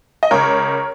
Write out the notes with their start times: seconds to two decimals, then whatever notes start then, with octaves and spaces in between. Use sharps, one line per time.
0.23 D#5
0.31 C#2 A#4 C#5